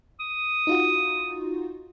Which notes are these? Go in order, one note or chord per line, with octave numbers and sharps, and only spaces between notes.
D#6
D#4 F4 F#4